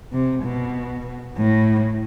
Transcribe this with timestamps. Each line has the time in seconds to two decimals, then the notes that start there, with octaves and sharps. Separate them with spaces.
0.12 C3
0.43 B2
1.37 A2